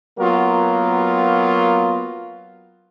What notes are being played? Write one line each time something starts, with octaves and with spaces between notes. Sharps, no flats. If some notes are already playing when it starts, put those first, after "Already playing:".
F#3 A#3 B3 F4 A#4